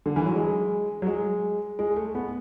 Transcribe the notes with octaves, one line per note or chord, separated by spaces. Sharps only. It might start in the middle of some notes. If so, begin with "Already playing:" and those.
D3
E3
F#3
G#3
F#3
G#3
G#3
A3
B3